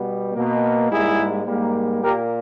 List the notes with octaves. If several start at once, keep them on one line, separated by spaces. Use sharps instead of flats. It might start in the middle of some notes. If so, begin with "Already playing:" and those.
Already playing: B2 G3 B3
B2 A#3
G#2 G3 A#3 E4 G#4
G#2 G3 A#3
A#2 A#3 G4 A#4